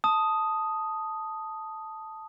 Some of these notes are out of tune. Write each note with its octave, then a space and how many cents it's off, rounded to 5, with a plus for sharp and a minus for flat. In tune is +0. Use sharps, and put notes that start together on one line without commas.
A5 +0 D#6 +0